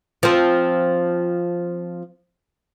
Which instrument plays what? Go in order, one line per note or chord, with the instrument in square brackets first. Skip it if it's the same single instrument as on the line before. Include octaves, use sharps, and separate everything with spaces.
[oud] F3 C4